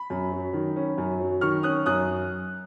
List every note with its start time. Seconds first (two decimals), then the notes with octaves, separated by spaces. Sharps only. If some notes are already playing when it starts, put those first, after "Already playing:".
Already playing: B5
0.10 F#2
0.32 F#3
0.53 D#3
0.76 C#4
0.98 F#2
1.20 F#3
1.41 D#3 C#6 F6
1.63 C#4 D#6 F#6
1.86 F#2 D#6 F#6